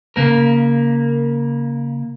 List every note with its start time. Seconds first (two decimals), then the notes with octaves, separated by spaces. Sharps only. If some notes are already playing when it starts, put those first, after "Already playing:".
0.16 C#3 A#3 A#4